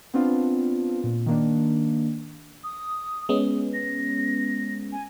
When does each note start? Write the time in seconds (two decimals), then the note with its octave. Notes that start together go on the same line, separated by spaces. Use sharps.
0.14 B3 C4 D4 F4
1.04 A#2
1.26 D#3 A#3 D4
2.64 D#6
3.29 G#3 B3 C#4
3.74 A#6
4.92 G#5